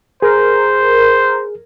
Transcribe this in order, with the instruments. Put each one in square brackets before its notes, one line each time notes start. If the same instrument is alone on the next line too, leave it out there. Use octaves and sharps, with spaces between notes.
[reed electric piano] G#4 [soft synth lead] A#4 [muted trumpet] C5